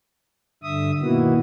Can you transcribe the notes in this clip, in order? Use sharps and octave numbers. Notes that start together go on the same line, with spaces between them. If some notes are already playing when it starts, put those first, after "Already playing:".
G2 D3 E5 D#6
B2 D#3 A#3 B3 E4 F#4